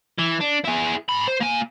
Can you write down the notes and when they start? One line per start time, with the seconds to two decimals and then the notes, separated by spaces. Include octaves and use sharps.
0.19 E3
0.41 D4
0.65 E4 G#4
1.09 G#2 B5
1.28 C5
1.41 A#3 G#5